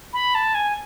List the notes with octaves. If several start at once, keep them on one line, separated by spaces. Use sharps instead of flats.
B5
A5
G#5